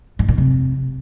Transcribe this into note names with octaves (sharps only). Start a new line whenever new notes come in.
A2
A#2
C3